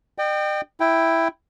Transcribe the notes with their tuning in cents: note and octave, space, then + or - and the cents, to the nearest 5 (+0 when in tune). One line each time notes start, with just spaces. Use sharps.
D#5 -45 G5 +0
E4 +0 G5 +0